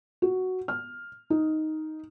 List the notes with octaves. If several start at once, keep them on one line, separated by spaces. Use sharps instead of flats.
F#4
F6
D#4